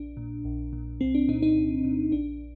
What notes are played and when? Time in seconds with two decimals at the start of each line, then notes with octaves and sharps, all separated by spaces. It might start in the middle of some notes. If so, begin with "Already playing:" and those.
Already playing: A#1 D4
0.17 A#2
0.45 A#1
0.73 A#2
1.01 C2 C4
1.15 D4
1.28 A#2 D#4
1.42 D#4
1.57 C2
1.84 A#2
2.11 A#1 D4